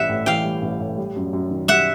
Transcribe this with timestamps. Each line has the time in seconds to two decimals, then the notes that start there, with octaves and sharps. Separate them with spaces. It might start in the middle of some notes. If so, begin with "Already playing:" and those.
Already playing: A1 E3 G3 E5 F#5
0.09 A2
0.26 E3 F5 G5
0.45 G3
0.62 A1
0.80 A2
0.98 G3
1.16 F#2
1.33 F#2
1.51 D#3
1.68 G3 E5 F#5